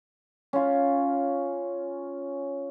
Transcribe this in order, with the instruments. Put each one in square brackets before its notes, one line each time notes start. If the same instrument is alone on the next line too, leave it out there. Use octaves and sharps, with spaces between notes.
[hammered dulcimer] C#4 F4